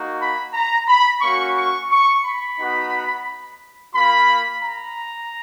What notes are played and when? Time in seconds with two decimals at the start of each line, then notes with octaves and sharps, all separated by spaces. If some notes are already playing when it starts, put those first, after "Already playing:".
Already playing: A#3 D#4 F#4
0.20 B5
0.53 A#5
0.87 B5
1.21 A#3 C#4 F#4 C#6
1.56 C#6
1.90 C#6
2.25 B5
2.58 B3 D#4 F#4
3.95 A#3 F4 B5
4.63 A#5